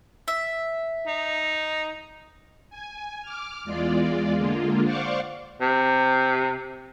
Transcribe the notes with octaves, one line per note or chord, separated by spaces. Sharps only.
E5
D#4
G#5
D6 F6
E2 G#3 F4 D5
D3 G#3 A#3 F4
C5 D5 F5 F#5 C#6 D6
C3